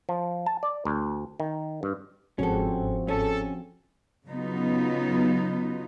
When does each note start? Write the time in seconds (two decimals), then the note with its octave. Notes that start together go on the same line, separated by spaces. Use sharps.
0.09 F3
0.46 A5
0.63 D5
0.85 D2
1.40 D#3
1.83 G2
2.39 G1 G#2 F3 C4 C#4 F#4 G#4 A4
3.08 C#4 A4
4.27 C#3 F#3 B3 D#4 F4